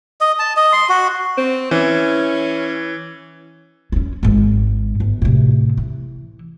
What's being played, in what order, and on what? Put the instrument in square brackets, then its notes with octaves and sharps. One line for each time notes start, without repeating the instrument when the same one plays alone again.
[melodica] D#5
A5
D#5
C6
F#4
[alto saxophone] C4
[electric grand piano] E3 [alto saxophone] C#4
[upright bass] C#4 D4
G#1 G#2
G1
A2 C3
E3